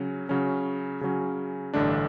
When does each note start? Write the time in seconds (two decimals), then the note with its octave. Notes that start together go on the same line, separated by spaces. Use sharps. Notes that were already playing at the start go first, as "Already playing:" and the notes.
Already playing: C#3 F#3 C#4
0.29 C#3 F#3 C#4
1.01 C#3 F#3 C#4
1.74 A1 G2 D3 A3 D4